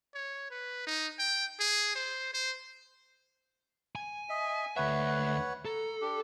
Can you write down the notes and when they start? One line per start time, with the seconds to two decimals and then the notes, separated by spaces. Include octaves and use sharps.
0.14 C#5
0.51 B4
0.87 D#4
1.19 G5
1.60 G#4
1.95 C5
2.34 C5
3.95 G#5
4.29 D#5 E5
4.76 D2 B4 C#5 E5 F#5
5.65 A4 A#5
6.01 D4 G4